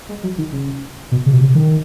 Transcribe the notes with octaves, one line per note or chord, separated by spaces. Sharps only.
G#3
F#3
D#3
C#3
B2
C#3
B2
C#3
D#3